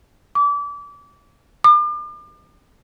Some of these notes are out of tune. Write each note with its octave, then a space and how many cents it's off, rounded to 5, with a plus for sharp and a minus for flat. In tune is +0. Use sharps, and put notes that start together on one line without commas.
D6 -30
D6 +40